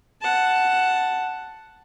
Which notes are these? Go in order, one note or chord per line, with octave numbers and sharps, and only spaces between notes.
F#5 A5